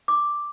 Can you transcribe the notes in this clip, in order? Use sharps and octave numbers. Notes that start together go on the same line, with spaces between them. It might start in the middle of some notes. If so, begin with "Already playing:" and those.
D6